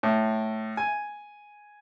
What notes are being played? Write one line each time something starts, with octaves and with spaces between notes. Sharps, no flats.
A2
G#5